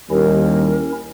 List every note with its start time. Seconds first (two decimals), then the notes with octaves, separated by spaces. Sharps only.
0.10 D#2 G3 C#4 E4 A#4